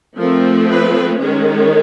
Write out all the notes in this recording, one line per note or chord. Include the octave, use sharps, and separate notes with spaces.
F3 A3 C4 A#4
B4
D#3 G#3 C#4